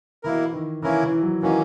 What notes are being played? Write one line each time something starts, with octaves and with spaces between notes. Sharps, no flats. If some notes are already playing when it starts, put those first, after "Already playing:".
B2 E3 A#3 E4 A#4
D#3
E3 A#3 C#4 E4 A#4
E3
F#3
D#3 E3 F#3 A#3 C#4